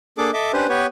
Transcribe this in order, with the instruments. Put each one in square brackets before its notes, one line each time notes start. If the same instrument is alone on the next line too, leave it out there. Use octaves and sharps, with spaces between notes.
[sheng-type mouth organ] A#3 D4 G#4 A4 D6
A4 D#5 E5 D6
C#4 D4 G4 B4 C5
B3 G4 B4 C#5